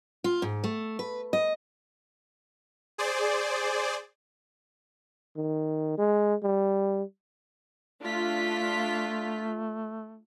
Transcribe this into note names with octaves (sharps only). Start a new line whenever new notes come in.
F4
G#2
A3
B4
D#5
G#4 C5 D5
D#3
G#3
G3
A3 D4 F4 B6